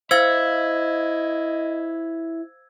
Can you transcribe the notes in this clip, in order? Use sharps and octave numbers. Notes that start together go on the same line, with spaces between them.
E4 C5 D#5 F5 E6 G#6